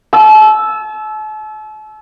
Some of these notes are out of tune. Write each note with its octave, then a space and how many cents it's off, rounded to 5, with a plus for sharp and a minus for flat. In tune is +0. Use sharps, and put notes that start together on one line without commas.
A5 -40 E6 +0